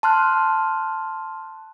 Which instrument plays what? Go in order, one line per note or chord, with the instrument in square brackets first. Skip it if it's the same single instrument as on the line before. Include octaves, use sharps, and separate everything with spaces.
[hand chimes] A5 C6 F6 F#6